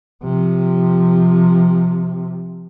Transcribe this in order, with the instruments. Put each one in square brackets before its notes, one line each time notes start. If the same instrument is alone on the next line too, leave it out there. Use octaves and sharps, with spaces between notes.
[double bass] C3 F3